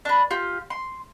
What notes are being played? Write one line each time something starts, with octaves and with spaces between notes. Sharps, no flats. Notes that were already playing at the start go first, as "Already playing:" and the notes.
D4 B4
F4 G4
C6